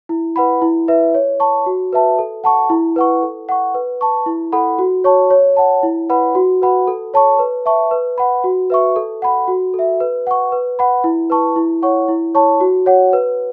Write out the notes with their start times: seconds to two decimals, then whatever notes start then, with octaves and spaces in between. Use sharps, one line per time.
0.09 E4
0.36 B4 F#5 B5
0.62 E4
0.88 B4 E5
1.14 C#5
1.40 A5 C#6
1.66 F#4
1.93 B4 E5 A5
2.19 A4
2.44 F#5 A5 C#6
2.70 E4
2.96 B4 F#5 C#6
3.23 A4
3.49 F#5 C#6
3.75 B4
4.01 A5 C#6
4.26 E4
4.52 A4 F#5 B5
4.79 F#4
5.04 C#5 A5 C#6
5.30 C#5
5.57 F#5 A5
5.83 E4
6.10 B4 F#5 B5
6.35 F#4
6.62 B4 F#5 B5
6.87 A4
7.14 C#5 A5 C#6
7.39 B4
7.66 E5 A5 C#6
7.91 B4
8.18 F#5 B5
8.44 F#4
8.70 B4 E5 C#6
8.96 A4
9.22 F#5 B5
9.48 F#4
9.74 A4
9.79 E5
10.00 B4
10.27 F#5 C#6
10.52 B4
10.79 F#5 B5
11.04 E4
11.30 B4 A5 C#6
11.56 E4
11.82 C#5 F#5 C#6
12.08 E4
12.35 C#5 A5 C#6
12.60 F#4
12.86 C#5 F#5
13.13 B4